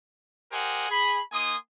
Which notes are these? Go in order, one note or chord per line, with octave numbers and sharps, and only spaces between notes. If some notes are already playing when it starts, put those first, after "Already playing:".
G4 A#4 C5 D#5 F#5 G#5
G#4 B5
A#3 D#4 G#5 C6 D#6